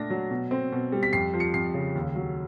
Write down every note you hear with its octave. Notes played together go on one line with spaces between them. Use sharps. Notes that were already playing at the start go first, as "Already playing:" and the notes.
Already playing: A#2 A3 D4 A#6
F#3
B2
C4
B2
G3
B6
F2 C7
F3
C#7
F2 C7
C#3
D#2
F#3